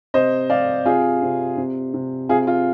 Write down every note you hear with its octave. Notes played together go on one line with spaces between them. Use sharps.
C3 C5 D#5
C3 D5 F5
C3 F4 G#4
C3
C3
C3
C3 F4 G#4
F4